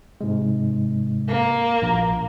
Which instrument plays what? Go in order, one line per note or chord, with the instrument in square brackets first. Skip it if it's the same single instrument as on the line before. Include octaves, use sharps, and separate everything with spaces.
[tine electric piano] G#2 C3 G#3
[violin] A#3
[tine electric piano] A#1 A#5